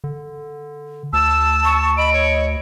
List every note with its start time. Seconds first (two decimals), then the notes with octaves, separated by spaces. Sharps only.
0.04 D3
1.13 D2 A5 E6
1.64 C#6
1.97 D#5 B5 D7
2.13 C#5